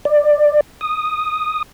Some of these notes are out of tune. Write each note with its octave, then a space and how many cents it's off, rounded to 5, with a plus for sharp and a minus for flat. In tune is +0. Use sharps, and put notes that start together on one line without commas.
D5 +15
D#6 -5